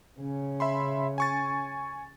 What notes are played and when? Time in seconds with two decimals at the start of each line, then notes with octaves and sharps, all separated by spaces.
0.20 C#3 C#4
0.60 E5 B5 C6
1.18 G#5 C#6 A6